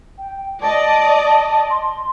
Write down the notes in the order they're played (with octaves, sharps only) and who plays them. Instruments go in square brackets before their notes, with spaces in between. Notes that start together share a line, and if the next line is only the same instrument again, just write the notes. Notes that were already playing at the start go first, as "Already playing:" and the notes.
[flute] G5
[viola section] D5 D#5 [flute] A5
[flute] C6